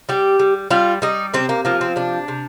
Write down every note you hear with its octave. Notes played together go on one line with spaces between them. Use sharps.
G3 G4
G3
G3 F4
G3 D#4
C3 C4
A#3
F3 A#3
C4
C3 D4
C3